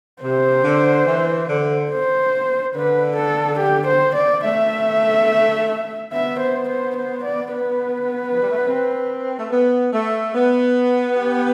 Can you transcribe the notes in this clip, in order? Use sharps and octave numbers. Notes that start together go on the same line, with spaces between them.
C3 C5
D3
E3
D3
C5
D3 B4
A4
G4
C5
D5
A3 E5
B3 E5
C5
C5
C5
D5
B4
F3
G3
A3
B3
C4
A3
B3
A3
B3
G4